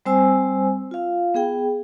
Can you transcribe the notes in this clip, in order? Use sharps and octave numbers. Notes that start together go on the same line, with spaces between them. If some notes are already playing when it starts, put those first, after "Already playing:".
G3 C4 C5 G#5 E6
F4 F5
B3 G#4 G5